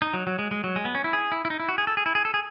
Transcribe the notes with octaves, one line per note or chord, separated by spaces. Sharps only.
D#4
F#3
F#3
G#3
G#3
F#3
G#3
B3
C#4
E4
G#4
E4
E4
D#4
E4
F#4
G#4
A4
G#4
E4
G#4
A4
G#4